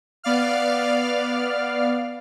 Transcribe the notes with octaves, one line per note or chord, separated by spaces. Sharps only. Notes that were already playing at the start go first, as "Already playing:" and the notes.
B3 D5 F5 F6